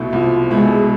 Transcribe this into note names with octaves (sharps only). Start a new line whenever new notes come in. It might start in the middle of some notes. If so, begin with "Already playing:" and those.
Already playing: C2 B2 A3 E4
C2 F3
B2 G#3 A3 E4